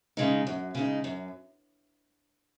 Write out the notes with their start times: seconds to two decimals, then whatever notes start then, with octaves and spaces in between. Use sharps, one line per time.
0.17 C#3 G#3 D#4
0.47 F#2
0.75 C#3 G#3 D#4
1.04 F#2